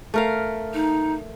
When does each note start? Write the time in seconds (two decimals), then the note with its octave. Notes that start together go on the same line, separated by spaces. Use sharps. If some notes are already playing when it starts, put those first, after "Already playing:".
0.14 A3 A#4 F5
0.74 D#4